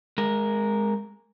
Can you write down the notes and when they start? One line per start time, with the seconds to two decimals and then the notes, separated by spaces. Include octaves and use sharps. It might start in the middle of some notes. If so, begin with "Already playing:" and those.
0.18 G#3 A#4